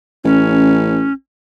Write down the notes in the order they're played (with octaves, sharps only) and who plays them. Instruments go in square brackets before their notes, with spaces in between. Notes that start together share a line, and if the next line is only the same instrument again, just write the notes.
[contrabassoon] A1 [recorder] C#4